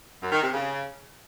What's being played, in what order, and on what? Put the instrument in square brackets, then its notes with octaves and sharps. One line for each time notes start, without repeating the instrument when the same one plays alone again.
[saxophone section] F#2
D#3
C3
C#3